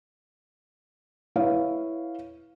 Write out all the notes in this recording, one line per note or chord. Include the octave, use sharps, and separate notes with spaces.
E4 B4 C#5 F5